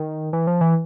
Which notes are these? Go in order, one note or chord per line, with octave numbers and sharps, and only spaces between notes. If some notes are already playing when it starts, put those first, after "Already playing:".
Already playing: D#3
E3
F3
E3